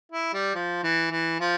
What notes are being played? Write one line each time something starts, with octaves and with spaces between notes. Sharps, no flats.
E4
G3
F3
E3
E3
F3